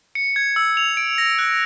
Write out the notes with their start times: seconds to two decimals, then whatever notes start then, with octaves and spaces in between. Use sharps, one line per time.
0.15 C#7
0.36 G#6
0.56 E6
0.77 F7
0.97 D7
1.18 A#6
1.39 F#6